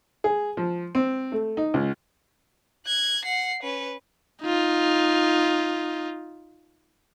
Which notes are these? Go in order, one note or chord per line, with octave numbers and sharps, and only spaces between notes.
G#4
F3
C4
A3
D#4
C#2
F#6 G#6
F#5 C7
C#4 B4
D#4 F4